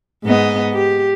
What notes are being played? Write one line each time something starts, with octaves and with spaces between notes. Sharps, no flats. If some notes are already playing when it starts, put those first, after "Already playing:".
G#2 B3 D#5
G4